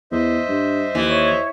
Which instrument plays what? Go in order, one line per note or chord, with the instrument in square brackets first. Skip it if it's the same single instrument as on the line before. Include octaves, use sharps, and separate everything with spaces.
[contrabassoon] E2 [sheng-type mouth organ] C5 D#5 E5
[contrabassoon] G2
[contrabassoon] D#2 [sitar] E3
[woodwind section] C#5